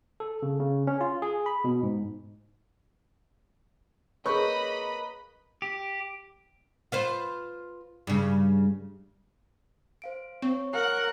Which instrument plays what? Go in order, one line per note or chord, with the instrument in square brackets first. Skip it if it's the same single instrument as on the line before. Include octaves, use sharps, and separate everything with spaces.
[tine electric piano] A4
C#3
C#3
C#4
F4
G#4
B5
B2
G#2
[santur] A#3 B4 [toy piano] G#4 C#5 [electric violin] D#5 B5 [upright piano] C#6
[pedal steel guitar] G4
[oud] F4 B4 C5
G2 C#3
[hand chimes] C5 F5 D7
[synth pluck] C4 [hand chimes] C#5 C#6
[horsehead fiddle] A#4 [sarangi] F#5